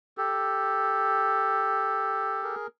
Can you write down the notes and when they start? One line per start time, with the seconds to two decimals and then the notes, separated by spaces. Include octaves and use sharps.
0.17 G4 A4
2.43 G#4 A#4